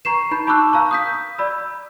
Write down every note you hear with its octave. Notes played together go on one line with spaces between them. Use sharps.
A#5 C#6 C7 E7
D#4 B5 G6
A5 B5 C#6 D6 E6 F#6
F5 A#5 C#6
D#6 G6 B6
D5 B5 E6